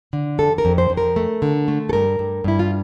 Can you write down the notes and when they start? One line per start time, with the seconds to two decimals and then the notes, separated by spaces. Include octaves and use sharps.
0.13 D3
0.39 F2 A4
0.58 A#4
0.65 F2
0.78 C5
0.90 F2
0.97 A#4
1.16 A3
1.42 D3
1.68 A3
1.89 A4
1.93 G2 A#4
2.19 G2
2.44 G2 E4
2.59 F4